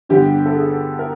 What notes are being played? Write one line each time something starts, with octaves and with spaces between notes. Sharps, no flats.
G2 D3 G3 B3 G4
A4
G#4
A#4